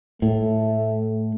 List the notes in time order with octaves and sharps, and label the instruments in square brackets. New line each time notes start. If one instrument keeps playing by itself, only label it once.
[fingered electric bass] A2 [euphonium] A3